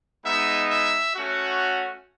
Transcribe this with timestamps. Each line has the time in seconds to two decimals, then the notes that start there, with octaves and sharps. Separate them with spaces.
0.24 G#3 B3 D#4 E5
0.69 E5
1.15 A3 C#4 F#4